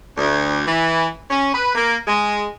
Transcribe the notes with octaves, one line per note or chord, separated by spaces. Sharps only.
D2
E3
C#4
B4
A#3
G#3